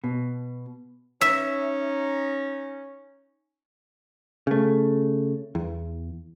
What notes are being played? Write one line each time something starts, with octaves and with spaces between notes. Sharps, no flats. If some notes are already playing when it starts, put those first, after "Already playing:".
B2
C#4 D#4 E5
C#3 A3
E2